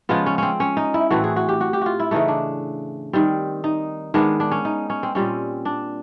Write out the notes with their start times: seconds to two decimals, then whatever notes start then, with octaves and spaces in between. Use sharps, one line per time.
0.09 C#3 F3 G#3 B3 F4
0.26 C#4
0.38 C4 C#4
0.60 C#4
0.77 D#4
0.94 E4
1.10 A2 E3 A3 C4 F#4
1.24 G#4
1.36 F#4
1.49 G4
1.61 F#4
1.73 G4
1.82 F4 F#4
2.00 E4
2.11 C#3 E3 A3 D#4
2.28 D4
3.13 D#3 G3 C4
3.64 D#4
4.14 D#3 G#3 B3 D4
4.40 D4
4.51 C#4
4.65 D#4
4.90 C#4
5.03 C4
5.15 A#2 G3 C4 C#4
5.65 D4